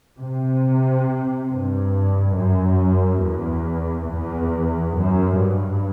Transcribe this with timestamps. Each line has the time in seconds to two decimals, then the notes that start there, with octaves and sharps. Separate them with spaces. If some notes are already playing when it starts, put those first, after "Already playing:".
0.20 C3
1.50 G2
2.37 F#2
3.24 E2
4.10 E2
4.98 F#2
5.41 G2